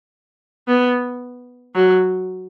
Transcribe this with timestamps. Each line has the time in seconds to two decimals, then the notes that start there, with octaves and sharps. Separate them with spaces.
0.68 B3
1.75 F#3